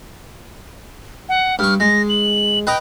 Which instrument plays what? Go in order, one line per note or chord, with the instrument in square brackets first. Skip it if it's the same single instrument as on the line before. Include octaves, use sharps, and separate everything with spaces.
[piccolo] F#5
[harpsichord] G2 C#6 [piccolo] F6
[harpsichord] G#3 [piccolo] A#6
[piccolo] F#7
[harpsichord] B4 D#5 A#5 [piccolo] G5